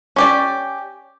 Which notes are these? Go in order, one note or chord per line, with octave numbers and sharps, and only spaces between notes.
C#4 G4 D5